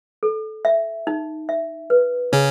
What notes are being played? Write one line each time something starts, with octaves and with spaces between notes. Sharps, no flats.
A4
E5
D#4
E5
B4
C#3 C#4 G#4